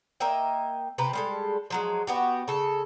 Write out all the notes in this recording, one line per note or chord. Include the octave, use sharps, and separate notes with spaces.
A#3 D#5 E5 G5
C3 G4 B4 A#5
G3 G#3 A4
F3 F#3 G#3
B3 F#4 G4
C#3 A4